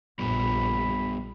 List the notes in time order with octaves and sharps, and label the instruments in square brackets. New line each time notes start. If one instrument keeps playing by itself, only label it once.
[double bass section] A#1 [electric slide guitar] G3 B3 F4 [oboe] B5